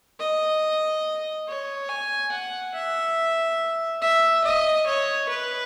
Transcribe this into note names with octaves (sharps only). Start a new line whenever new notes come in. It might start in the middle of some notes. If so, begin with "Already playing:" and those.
D#5
C#5
G#5
F#5
E5
E5
D#5
C#5
B4